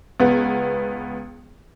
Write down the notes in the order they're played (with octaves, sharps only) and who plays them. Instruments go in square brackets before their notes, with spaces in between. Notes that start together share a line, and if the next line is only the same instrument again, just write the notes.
[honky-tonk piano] C#2 B3